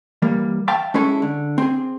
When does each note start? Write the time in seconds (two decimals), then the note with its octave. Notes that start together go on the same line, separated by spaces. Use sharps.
0.22 E3 G3 A#3
0.68 E5 F5 G5 A5
0.94 G#3 C#4 E4 G#4 A4
1.22 D3
1.58 C4 G#4